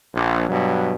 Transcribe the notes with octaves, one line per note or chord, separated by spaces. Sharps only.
A#1
G2 B2 F#3